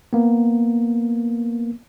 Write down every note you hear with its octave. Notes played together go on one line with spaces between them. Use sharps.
A#3 B3